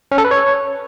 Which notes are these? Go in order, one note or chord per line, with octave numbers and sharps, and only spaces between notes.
C#4
A4
B4
C#5